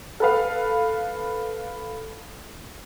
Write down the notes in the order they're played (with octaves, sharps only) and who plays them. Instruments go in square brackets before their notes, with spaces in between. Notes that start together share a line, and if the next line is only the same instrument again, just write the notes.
[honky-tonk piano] A4 B4 F5